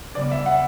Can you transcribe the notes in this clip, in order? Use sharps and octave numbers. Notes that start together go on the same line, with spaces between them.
C#3 G3 B3 F#4 D5
E5
F#5